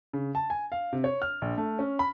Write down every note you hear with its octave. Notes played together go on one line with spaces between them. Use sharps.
C#3
A5
G#5
F5
C3
C#5
F6
A#1
A3
C#4
B5